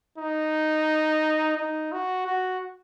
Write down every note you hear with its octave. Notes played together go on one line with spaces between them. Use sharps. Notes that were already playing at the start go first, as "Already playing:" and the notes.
D#4
D#4
F#4
F#4